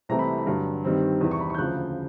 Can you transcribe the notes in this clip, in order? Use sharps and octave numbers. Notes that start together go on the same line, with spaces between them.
C2 C3 E3 A3 C4 A#5
B5
B5
G2 D3 F#3 A#5
G2 D#3 G3 C4
E2 C3 E3
C#6
B5
C#6
G6
D2 C#3 F3 F#6